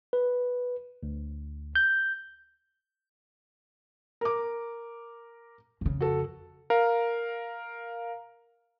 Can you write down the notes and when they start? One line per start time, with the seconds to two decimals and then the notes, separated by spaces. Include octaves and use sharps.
0.13 B4
1.03 D2
1.75 G6
4.21 A#4 D6
5.81 F2 C#3
6.01 F#4 A4
6.70 A#4 F5